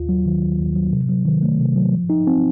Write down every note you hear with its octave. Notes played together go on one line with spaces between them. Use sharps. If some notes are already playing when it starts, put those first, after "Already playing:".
Already playing: D#2 F4
F#3
D#3
D#2
D#2
F#3
C3
F#3
D#3
A3
C3
F#3
F3
D#4
C4